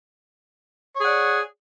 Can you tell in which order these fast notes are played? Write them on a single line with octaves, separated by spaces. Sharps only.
C#5 G#4 F#5 D5